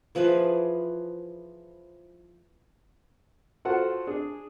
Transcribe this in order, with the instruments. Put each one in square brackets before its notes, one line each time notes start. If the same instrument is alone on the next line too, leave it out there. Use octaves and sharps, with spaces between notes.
[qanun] E3 F3 G#4 B4
[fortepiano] F4 F#4 A4 C5 F#5
D4 G#4